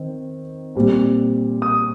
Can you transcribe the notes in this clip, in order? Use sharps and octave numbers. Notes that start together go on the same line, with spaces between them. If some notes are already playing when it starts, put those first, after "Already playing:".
Already playing: D#3 C4
A#2 G3 C4
D#6